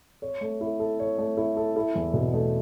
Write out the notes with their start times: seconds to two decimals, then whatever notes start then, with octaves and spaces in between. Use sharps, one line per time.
0.22 C#5
0.41 A3
0.61 E4
0.79 A4
1.00 C#5
1.18 A3
1.37 E4
1.57 A4
1.76 E4
1.95 E2
2.14 B2
2.34 A3